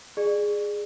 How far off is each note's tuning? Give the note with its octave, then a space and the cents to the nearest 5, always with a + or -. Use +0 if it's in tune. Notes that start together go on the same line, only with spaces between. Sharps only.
G#4 -5 D5 +25